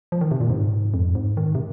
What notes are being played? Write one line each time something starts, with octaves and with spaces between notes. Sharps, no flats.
F3
D#3
C3
A#2
G#2
F2
G#2
D#3
C3